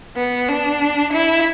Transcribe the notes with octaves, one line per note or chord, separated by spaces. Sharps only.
B3
D4
E4